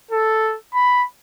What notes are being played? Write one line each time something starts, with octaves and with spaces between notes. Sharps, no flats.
A4
B5